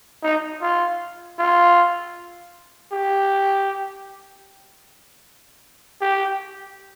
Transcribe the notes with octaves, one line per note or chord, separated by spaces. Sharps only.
D#4
F4
F4
G4
G4